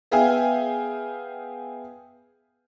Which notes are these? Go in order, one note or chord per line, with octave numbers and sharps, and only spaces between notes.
B3 G#4 E5 F5 G5 G#5